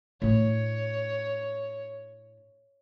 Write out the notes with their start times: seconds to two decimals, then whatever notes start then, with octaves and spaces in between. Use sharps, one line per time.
0.22 A2 D4 C#5